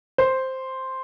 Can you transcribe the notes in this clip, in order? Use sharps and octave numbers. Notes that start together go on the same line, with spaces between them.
C5